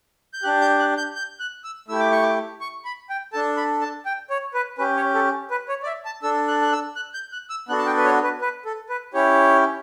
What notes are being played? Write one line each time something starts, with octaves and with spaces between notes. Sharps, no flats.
G6
D4 G4 F#6
G6
F#6
G6
G6
F#6
E6
A3 E4 G4 E6
D6
C#6
D6
C#6
B5
G5
D4 A4 A5
B5
A5
G5
C#5
B4
C#4 G4 B4
C#5
A4
B4
C#5
D5
E5
A5
D4 A4 E6
F#6
F#6
E6
F#6
G6
F#6
E6
B3 D4 F#4 A4 F#6
A5
G5
B4
C#5
B4
B4
A4
B4
C#4 E4 G4 C#5